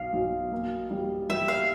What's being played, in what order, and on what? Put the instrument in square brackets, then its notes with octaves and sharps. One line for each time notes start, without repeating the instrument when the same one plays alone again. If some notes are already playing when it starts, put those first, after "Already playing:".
Already playing: [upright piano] B1 [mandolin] F5
[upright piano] B1
A#3
G3
[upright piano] G3 [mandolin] E5
[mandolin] F5